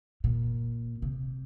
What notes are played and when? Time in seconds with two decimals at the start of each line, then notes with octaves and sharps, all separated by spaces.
0.24 A#2
1.02 C3